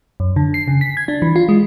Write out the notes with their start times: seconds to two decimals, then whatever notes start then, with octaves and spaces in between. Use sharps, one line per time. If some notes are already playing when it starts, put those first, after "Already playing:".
0.20 F#2
0.36 D3
0.54 C7
0.68 C#3
0.81 B6
0.97 G#6
1.08 D4
1.22 E3
1.36 F4
1.49 G#3